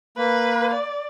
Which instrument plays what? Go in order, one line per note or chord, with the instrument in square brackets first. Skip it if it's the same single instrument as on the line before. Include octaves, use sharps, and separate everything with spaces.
[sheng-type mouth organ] A#3 [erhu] B4
[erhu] D5